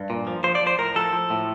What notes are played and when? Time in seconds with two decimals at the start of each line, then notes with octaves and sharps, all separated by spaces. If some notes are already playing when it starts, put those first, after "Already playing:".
Already playing: G2
0.10 A#2
0.27 F3
0.44 F3 C5
0.55 D5
0.61 F3
0.67 C5
0.78 A2 A#4
0.95 F3 A4
1.13 F3
1.30 A2